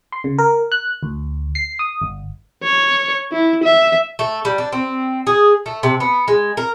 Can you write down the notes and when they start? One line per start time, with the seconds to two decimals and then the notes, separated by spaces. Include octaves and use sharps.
0.12 C6
0.24 C#3
0.38 A#4
0.72 F#6
1.03 D2
1.55 C7
1.79 D#6
2.02 G1
2.63 C#5
3.32 E4
3.64 E5
4.19 A3
4.45 G3
4.58 D4
4.72 C4
5.27 G#4
5.66 A3
5.83 C3
6.00 B3
6.28 G#3
6.57 A#4